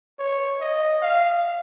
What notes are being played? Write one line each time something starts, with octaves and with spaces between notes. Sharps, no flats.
C#5
D#5
F5